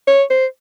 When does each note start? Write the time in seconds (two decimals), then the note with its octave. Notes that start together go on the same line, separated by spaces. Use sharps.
0.07 C#5
0.30 C5